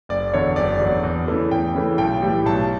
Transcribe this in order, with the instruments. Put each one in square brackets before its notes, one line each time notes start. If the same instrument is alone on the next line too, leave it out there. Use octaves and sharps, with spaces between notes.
[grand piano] F#1 D5
E2 D3 F#3 C#5
F#1 D5
E2 D3 F#3
E2
C#3 E3 A3
E2 G5
C#3 E3 A3
B1 G5
A2 E3 G3
B1 A5